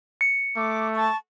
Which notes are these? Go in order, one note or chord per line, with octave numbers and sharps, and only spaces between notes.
C#7
A3 D6
A5 C#6